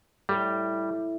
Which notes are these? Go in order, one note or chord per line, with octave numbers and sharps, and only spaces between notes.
A2 G3